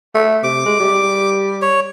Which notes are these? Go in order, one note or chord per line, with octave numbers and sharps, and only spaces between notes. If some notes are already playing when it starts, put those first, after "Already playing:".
A3
C3 D6
G#3
G3
C#5